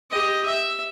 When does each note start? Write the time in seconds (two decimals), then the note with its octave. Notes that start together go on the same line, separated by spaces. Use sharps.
0.11 G4 D#5
0.46 E5